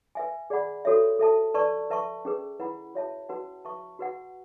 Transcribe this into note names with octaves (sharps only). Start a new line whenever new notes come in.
B4 E5 G#5
G#4 D5 F#5 B5
F#4 A4 C#5 E5
A4 E5 A5
B4 D5 A5 C#6
B4 E5 A5 C#6
C#4 G#4 B4
E4 B4 F#5 B5
F#4 C#5 E5 A5
C#4 F#4 B4 F#5 A5
B4 E5 A5 C#6
F#4 B4 F#5